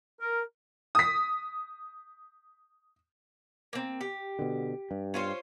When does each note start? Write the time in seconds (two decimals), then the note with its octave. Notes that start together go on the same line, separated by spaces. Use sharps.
0.21 A#4
0.95 D#6 B6
3.73 A#3 C4
4.01 G4
4.39 B2 D3
4.91 G2
5.14 C#4 F4 C5